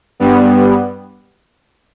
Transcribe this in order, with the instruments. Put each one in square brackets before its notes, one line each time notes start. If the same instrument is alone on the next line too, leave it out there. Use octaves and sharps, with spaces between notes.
[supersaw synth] G2 G3 B3